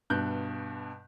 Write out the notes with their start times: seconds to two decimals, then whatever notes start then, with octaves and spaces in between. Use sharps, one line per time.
0.10 G2 B2 F#6 G6